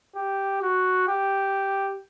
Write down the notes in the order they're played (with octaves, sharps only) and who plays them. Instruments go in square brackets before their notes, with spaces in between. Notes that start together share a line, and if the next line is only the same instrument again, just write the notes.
[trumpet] G4
F#4
G4